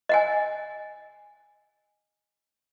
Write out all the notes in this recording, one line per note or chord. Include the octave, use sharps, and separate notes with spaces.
D#5 F#5 G#5